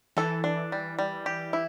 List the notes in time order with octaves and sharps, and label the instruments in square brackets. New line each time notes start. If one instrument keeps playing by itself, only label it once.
[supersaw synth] E3 [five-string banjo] A4
[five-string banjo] D4
G3
G3
G4
E4